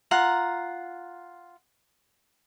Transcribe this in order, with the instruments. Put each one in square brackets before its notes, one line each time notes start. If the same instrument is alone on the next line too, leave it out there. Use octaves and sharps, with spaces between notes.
[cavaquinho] F4 F#5 A#5